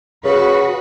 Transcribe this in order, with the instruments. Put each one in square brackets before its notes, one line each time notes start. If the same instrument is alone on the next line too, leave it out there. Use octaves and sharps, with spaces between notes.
[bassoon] C#3 [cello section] F#4 B4